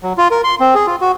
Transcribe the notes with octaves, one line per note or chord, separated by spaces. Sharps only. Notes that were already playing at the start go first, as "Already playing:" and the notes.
F#3
F4
A#4
C6
C4
G#4
F4
F#4